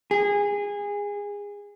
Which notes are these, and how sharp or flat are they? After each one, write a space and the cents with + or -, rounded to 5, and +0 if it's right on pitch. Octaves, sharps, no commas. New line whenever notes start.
G#4 -20